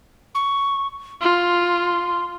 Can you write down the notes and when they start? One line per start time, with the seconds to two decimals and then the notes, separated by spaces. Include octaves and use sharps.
0.35 C#6
1.21 F4 C6